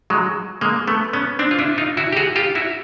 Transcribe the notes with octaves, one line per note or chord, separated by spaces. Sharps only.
F#3 G#3
G#3 A#3
A3 B3
B3 C#4
C4 D4
F4
D4 E4
D#4 F4
E4 F#4
G4
F#4 G#4
F4 G4
E4 F#4